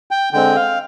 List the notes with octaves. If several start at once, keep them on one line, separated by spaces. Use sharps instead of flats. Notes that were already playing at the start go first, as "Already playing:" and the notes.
G5
D3 G#3 C4 G5
F5